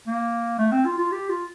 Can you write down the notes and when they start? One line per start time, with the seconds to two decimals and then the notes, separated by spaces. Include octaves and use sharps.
0.07 A#3
0.59 A3
0.72 C4
0.86 F4
0.98 F4
1.12 G4
1.29 F4